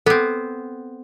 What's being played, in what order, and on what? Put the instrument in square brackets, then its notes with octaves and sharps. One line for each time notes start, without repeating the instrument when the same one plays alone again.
[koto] B3 C4 [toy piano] A4